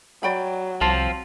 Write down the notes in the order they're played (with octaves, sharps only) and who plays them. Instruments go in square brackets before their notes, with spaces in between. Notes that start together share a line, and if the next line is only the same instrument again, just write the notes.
[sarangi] F#3 [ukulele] D5 G5 B5
[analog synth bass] C2 [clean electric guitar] F3 C4 F4 [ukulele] A5